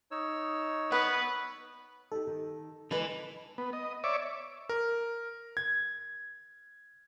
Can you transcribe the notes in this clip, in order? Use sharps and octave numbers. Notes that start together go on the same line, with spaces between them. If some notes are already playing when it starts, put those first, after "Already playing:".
D#4 C#5 E6
B3 B4
D#4 G4 A4
D#3
D3 E3 G#3 A#4 B4 D#5
B3
D#5
C#5 D5 E5 D6
A#4
G#6